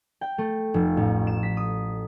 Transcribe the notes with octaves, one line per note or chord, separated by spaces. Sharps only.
G5
A3
F1
A1
E7
B6
D#6